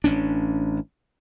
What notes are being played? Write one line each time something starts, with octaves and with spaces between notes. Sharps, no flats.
A1 C#4 D4